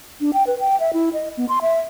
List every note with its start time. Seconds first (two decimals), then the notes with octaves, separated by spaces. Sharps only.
0.21 D4
0.33 G5
0.47 B4
0.60 G5
0.80 E5
0.93 E4
1.13 D#5
1.37 B3
1.49 C6
1.62 E5